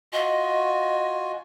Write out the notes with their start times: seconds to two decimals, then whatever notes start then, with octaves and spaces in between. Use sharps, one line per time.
0.13 F4 F#4 D#5 G#5